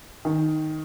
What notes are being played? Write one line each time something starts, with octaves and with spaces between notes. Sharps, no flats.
D#3